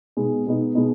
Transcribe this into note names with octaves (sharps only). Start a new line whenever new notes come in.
B2 G#3 B3 D#4
B2 G#3 B3 D#4
B2 G#3 B3 D#4